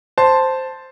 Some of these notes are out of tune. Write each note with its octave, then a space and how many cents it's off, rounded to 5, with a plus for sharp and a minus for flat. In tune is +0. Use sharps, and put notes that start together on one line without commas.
C5 +0 A5 +0